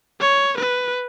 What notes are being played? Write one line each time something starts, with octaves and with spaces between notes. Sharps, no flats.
C#5
B4